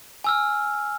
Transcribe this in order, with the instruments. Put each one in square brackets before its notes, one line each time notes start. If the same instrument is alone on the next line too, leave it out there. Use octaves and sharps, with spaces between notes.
[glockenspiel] G#5 E6 F6